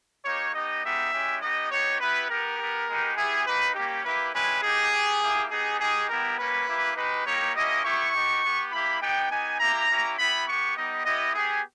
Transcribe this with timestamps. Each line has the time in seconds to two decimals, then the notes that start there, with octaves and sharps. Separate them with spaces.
0.25 A#3 D#4 G4 C#5
0.54 B3 D#4 G4 D#5
0.84 G#3 B3 D#4 G4 E5
1.13 G#3 C#4 E4 G4
1.41 B3 D#4 G4 D#5
1.71 B3 D#4 G4 C#5
2.00 B3 E4 G4 B4
2.29 B3 G4 A#4
2.58 B3 G4
2.88 G#3 B3 D#4 G4
3.17 B3 E4 G4 G#4
3.46 A#3 D#4 G4 B4
3.75 G3 A#3 C#4 G4
4.04 A#3 E4 G4 B4
4.34 G#3 C#4 E4 G4 B4
4.63 A#3 D#4 G4 G#4
4.92 B3 G4
5.22 A#3 E4 G4
5.51 B3 D#4 G4 G#4
5.79 G#3 D#4 G4 G#4
6.09 G3 B3 E4 G4 A#4
6.38 G3 A#3 C#4 B4
6.68 A#3 E4 G4
6.96 G#3 D#4 G4 B4
7.26 G3 A#3 D#4 G4 C#5
7.55 A#3 C#4 E4 G4 D#5
7.84 B3 E4 G4 C#6
8.13 B3 D#4 G4
8.43 B3 G4
8.72 A#3 E4 G4 B5
9.01 B3 D#4 G4 G5
9.30 B3 D#4 G4 G#5
9.60 A#3 E4 G4 A#5
9.88 A#3 C#4 E4 G4
10.18 B3 E4 G4 B5
10.47 B3 G4 C#6
10.76 G3 B3 D#4 G4 D#5
11.05 B3 E4 G4 D#5
11.35 B3 G4 G#4